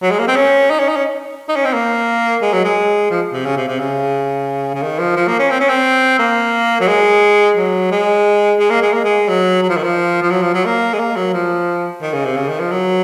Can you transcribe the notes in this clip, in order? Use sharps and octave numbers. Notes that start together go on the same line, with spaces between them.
F#3
G#3
A#3
C4
C#4
D#4
C#4
D#4
C#4
D#4
C#4
C4
A#3
G#3
F#3
G#3
F3
C3
C#3
C3
C3
C#3
C#3
D#3
F3
F3
A#3
C#4
C4
C#4
C4
A#3
F#3
G#3
F#3
G#3
G#3
A#3
G#3
A#3
G#3
F#3
F#3
F3
D#3
F3
F3
F#3
F3
F#3
A#3
G#3
A#3
F#3
F3
D#3
C#3
C3
C#3
D#3
F3
F#3